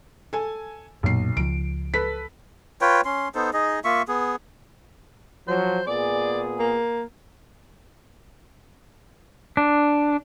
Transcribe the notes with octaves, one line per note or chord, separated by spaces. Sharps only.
A4 G#5
B1 F#2 A#2 C7
C#2 F3 D7
A4 B4 B6
F4 B4 C#5 G5
C#4 C6
B3 D#4 A4 C5
D#4 G#4 D#5
A#3 F4 E5 C#6
B3 G#4
F3 F#3 C5
A#2 B3 G#4 D5
A#3
D4